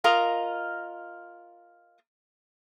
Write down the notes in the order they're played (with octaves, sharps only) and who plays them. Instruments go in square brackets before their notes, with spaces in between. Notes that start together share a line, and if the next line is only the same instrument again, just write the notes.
[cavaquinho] F4 A#4 D#5